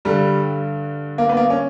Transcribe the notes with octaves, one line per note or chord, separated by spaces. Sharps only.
G2 D3 G3
A#3
B3
A#3
C#4